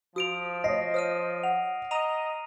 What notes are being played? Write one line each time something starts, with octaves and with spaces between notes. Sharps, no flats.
F3 F#4 D#6 D7 F7
C#5 D#5 A#6 C7
C5 D#6 F6 D#7
F#5 F7
D#5 A#5 D#7 F7